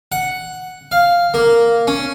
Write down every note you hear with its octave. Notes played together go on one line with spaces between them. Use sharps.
F#5
F5
A#3
C#4